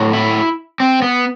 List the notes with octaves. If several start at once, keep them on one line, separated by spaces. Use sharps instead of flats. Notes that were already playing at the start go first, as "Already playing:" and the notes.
Already playing: A2 F#3
E4
C4
B3